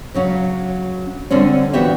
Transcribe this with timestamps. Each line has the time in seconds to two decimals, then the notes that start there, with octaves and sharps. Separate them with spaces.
0.14 C#3 F#3 C#4
1.31 D3 G3 C4 C#4
1.73 A#2 E3 B3 F#4 G4 E5